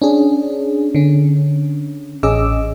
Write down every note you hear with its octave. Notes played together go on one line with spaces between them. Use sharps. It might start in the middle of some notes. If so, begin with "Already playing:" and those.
C#4 D4 G#4
D3 C#4
A1 C#4 G#4 D#5 D6 E6